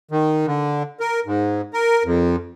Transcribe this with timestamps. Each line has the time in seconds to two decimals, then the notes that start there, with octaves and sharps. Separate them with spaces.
0.11 D#3
0.46 D3
1.00 A#4
1.26 G#2
1.73 A#4
2.04 F2